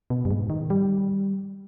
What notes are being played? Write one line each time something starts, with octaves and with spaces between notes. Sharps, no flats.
B2
G2
G#2
D#3
G3